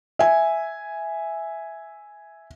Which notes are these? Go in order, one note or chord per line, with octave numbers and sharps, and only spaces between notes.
E5 G#5